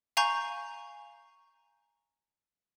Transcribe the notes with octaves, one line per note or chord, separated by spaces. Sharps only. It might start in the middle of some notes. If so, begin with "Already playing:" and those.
F5 G#5 A#5 C#6 G6